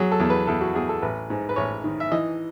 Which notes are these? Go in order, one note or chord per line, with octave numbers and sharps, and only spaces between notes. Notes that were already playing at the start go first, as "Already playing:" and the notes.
Already playing: F#3 G#4
A4
E2
B4
E2 A4
F#4
E2 G#4
A4
A1 B4
G#2
B4
A1 C#5
D#3
E5
E3 D#5